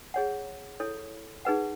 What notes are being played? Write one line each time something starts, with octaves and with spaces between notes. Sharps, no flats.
G#4 C#5 F#5
E4 A4 C#5
D#4 G#4 B4 F#5